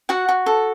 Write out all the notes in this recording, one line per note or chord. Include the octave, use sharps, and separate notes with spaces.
F#4 F#5
F#4
A4